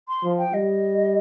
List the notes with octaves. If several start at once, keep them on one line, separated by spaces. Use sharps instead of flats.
C6
F3
G5
G3 D#5